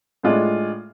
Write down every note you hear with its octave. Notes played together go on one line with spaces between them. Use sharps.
A2 G#3 D4 F4